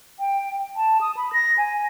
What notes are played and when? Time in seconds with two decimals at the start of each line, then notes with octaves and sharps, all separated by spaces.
0.20 G5
0.76 A5
1.01 D#6
1.17 B5
1.33 A#6
1.58 G#5